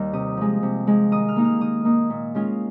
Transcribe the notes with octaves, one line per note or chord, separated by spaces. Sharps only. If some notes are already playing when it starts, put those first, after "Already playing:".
Already playing: D#2 D#3 G3
C3 D#6
F3 G#3
C3
F3 G#3
D#3 D#6
F6
A#3 D#4
F6
D#3 D#6
A#3 D#4
A#2
G#3 C#4 F4